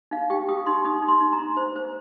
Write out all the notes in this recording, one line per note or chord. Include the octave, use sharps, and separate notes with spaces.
D#4 F5
G4 G5
G4 D#6
D#4 C6
D#4 D#6
D#4
C6
D#4
A#5
D#4
C5
C5